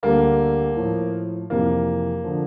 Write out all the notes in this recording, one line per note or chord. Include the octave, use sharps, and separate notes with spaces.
D2 D3 G3 A#3
A2 F3
F2 C3 E3 A#3
D3 F3